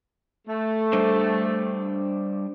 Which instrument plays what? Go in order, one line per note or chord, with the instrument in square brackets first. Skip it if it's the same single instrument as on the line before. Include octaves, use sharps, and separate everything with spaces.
[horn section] A3
[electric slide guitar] G3 D4 C5